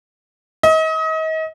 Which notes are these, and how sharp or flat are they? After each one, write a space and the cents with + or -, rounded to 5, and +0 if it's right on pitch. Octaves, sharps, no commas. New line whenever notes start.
D#5 +35